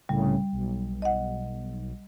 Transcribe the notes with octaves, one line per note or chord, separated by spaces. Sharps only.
C2 A2 C#3 G3
B1
D#5 F#5